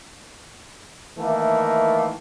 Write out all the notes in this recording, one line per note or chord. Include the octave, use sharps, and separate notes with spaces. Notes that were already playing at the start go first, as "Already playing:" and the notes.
D#3 E3 A3 A#3